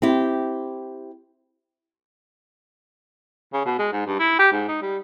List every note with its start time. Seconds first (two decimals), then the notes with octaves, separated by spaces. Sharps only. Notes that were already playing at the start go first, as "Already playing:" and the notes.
0.02 C4 E4 G4
3.53 C#3
3.65 B2
3.79 G#3
3.92 G#2
4.06 G2
4.19 E4
4.39 G4
4.52 G#2
4.68 D#4
4.82 G3